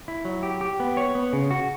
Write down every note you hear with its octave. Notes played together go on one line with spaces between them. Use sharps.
E4
F#3
G4
G4
B3
C#5
B3
C#3
F#4